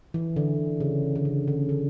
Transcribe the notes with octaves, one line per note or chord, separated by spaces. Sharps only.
E3
D3
C#3
D3
C#3
D3
D3